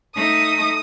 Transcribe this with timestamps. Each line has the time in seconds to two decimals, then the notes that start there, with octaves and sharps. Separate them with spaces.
0.16 A3 D#4 D#6